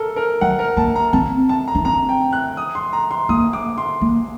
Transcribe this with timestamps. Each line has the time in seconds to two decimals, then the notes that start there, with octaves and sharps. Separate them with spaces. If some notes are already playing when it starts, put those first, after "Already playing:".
Already playing: A4 A#4
0.16 A#4
0.41 F#3 F#5
0.59 A#4
0.77 A#3 A5
0.96 A#5
1.13 C4 A5
1.49 A5
1.68 A#5
1.75 D4
1.85 C4 A#5
2.09 G5
2.33 F#6
2.57 D#6
2.75 C6
2.93 A#5
3.11 C6
3.29 A#3 D#6
3.53 D6
3.78 C6
4.01 A#3